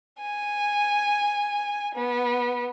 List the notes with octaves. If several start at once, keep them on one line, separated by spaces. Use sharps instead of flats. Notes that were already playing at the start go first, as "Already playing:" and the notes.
G#5
B3